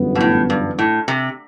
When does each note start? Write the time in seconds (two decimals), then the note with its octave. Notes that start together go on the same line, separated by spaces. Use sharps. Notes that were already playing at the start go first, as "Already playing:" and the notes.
Already playing: G1 F#2 E3 B3
0.15 B2
0.20 A2
0.50 G2
0.79 A2
1.08 C3